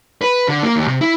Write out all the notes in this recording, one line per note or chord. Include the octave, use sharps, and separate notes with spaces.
B4
D3
A#3
D#2
C3
E4